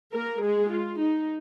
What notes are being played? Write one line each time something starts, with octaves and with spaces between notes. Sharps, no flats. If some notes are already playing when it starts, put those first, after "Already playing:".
A#3 A#4
G#3 G#4
F4
D#4